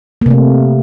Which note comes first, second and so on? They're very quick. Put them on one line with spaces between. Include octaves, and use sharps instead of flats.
A#3 C3 A3